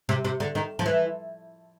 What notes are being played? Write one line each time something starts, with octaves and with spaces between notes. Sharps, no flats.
C3
C3
D3
D#3
F3
E3